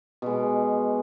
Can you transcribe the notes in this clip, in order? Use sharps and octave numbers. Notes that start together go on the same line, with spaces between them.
B2 G#3